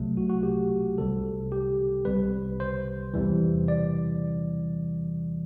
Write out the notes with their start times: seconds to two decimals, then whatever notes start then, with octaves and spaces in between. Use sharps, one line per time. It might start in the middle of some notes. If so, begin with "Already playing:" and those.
Already playing: C2 C3 F#3 A3
0.17 F#4
0.30 F#4
0.43 G4
0.98 C2 C3 G3 A4
1.52 G4
2.05 C2 C3 G3 B4
2.60 C5
3.14 E2 C3 E3 G3
3.68 D5